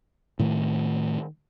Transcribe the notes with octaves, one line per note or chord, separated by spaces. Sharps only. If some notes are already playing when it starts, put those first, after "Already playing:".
A2 D#3 A3